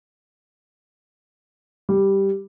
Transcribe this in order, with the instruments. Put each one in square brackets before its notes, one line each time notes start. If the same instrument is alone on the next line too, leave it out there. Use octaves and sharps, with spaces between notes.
[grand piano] G3